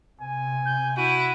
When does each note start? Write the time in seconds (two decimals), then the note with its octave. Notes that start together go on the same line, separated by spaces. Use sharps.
0.21 C3 G#5
0.65 G6
0.97 E4 F#4 D#7